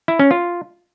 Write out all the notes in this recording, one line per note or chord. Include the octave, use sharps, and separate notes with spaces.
E4
C#4
F4